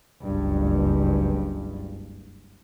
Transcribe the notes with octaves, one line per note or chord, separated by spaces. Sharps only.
F#1 C#2 G2